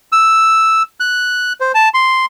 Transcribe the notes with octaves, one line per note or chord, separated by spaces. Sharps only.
E6
F#6
C5
A5
C6